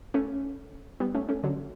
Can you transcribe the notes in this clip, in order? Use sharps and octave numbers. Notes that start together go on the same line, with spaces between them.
A3 C#4
G3 B3
A3 C#4
A3 C#4
D3 F#3